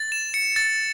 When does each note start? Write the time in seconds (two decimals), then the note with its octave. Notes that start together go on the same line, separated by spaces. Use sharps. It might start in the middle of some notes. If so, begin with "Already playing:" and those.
Already playing: A6
0.12 E7
0.34 C#7
0.56 A6